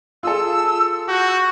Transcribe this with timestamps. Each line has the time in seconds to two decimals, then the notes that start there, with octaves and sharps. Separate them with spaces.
0.23 F4 G#4 A4 E6
1.09 F#4 G6